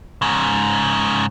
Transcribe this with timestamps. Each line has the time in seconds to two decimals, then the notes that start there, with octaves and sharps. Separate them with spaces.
0.22 G#2 C#3